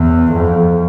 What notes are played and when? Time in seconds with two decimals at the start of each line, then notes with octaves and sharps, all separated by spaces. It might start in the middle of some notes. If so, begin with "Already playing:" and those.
Already playing: E2
0.33 F2